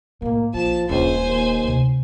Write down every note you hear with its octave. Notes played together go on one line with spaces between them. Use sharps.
A2 G#3 A#3
A#1 F3 A5 E7
D#1 C#2 D4 C5 G#5
D#2
D2 C3